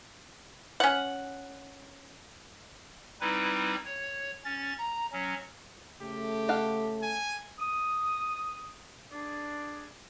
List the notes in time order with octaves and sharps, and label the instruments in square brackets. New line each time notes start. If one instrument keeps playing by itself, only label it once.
[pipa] C#4 F#5
[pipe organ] G3 C4 D#4 E4 B4
C#5
C#4 A6
A#5
F#3 C#4
[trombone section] C#3 A3 [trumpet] G4
[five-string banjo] A4 F5 F#5
[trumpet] G#5
[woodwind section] D#6
D4 G#4 D5